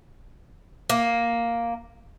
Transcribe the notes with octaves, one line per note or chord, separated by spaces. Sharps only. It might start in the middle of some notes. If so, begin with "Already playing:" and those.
A#3